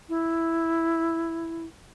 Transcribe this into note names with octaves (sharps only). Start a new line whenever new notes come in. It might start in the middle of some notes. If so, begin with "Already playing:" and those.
E4